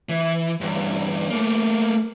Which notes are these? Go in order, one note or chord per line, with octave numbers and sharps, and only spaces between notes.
E3
E2 G2
A3 A#3